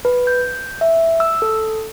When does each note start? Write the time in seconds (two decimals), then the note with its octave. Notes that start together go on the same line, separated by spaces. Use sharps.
0.05 B4
0.27 G6
0.81 E5
1.20 E6
1.42 A4